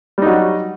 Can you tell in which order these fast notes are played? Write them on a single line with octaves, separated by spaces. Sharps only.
G3 D#4 F#3